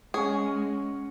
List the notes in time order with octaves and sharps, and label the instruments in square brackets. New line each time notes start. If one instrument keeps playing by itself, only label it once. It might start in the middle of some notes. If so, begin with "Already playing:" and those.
[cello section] G#3 [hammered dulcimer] C#4 C#5 F#5 [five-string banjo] G#4